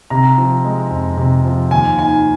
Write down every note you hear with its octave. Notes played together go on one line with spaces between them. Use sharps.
C3 A#5
F3
G#3
F2
C3
F3
D#2 G#5
D#3 G#5